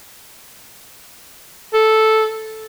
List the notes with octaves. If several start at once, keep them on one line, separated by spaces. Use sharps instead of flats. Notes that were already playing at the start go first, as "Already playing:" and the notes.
A4